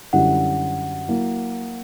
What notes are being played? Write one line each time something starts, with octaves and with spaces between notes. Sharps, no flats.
F#2 D3 G3 C#4 E4 F#5
F#3 A#3 E4